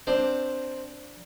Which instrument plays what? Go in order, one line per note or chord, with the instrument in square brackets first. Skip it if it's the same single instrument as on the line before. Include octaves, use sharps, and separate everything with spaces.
[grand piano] C4 [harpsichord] D4 C5